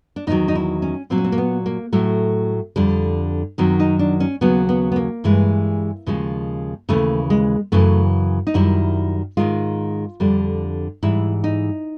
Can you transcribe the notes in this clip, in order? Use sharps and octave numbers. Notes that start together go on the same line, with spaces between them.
D4
E2 C3 D#3 F#3 D#4
D#4
E4
C#4
A#2 F#3 C4
C#4
C4
A#3
B3
A#3
A2 F#3 A3
F2 D3 G3
F#2 D#3 F#3 C4
D#4
D4
C#4
D#2 C#3 F#3 B3
B3
B3
A#3
G2 E3 G#3
D#2 C#3 F3 G#3
D#2 C#3 E3 A3
G#3
F#2 C#3 E3 A3
D#4
F#2 D#3 G3 E4
G#2 D#3 G#3 F4
F2 D3 G3
G#2 E3 G3 E4
D#4